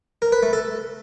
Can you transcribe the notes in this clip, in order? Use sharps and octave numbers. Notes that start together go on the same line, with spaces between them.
A#4
B4
A3
A4